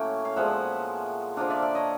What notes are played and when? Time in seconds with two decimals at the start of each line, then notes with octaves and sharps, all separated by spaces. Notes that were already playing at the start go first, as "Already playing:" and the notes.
Already playing: A2 F#3 A#3 C#4 G5
0.25 F5
0.36 A#2 F3 G#3 B3 E5 F#5
1.37 D3 F3 A#3 D4 D#5 F5
1.50 D5 E5
1.62 D5 E5
1.75 C#5 D#5